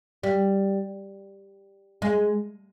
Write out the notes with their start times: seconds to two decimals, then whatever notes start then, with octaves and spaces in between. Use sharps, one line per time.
0.23 G3
2.02 G#3